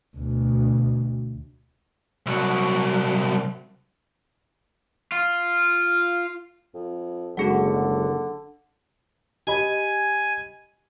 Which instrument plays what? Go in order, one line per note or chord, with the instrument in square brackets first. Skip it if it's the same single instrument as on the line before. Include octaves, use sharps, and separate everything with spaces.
[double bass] D2 B2
[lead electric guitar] C2 F#3
[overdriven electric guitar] F4
[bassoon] F2
[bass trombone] F#1 [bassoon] D3 [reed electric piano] F#3 G#3 [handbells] F#4 G#4 F#5
[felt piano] G4 D#5 B5 [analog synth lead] G#5